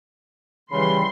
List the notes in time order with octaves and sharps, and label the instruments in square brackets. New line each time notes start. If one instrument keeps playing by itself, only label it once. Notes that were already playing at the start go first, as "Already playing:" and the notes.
[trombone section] C#3 G3 [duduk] E3 [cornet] B5 [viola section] C6